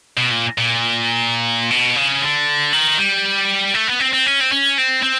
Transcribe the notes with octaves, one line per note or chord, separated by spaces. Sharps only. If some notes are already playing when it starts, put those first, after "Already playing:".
B2
A#2
A#2
B2
C#3
D3
D#3
G3
A3
B3
C4
C4
C#4
C4
C#4
C4
C4